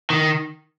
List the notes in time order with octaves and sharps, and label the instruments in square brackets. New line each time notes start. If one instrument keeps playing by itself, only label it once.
[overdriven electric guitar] D#3